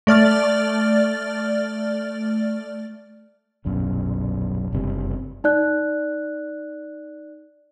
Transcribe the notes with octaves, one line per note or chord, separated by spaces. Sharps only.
A3 D5 F6 A6
D#1 B1 F#2
F#1 G2 C3
D#4 D5 F#6